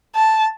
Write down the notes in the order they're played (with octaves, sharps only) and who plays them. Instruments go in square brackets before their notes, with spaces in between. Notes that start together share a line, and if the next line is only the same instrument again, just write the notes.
[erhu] A5